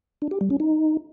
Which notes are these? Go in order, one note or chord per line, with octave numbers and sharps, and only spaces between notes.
D4
G4
G3
C#4
D#4